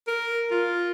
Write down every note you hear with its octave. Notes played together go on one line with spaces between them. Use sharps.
A#4
F4